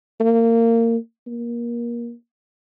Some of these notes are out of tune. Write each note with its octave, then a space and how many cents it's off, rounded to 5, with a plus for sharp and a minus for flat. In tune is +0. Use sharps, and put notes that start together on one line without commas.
A#3 -25
A#3 +25